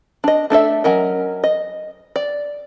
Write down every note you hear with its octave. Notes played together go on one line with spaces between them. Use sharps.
D4 D#5
A3 D4 A4 E5
F#3 C#4 A#4 D#5
D#5
D5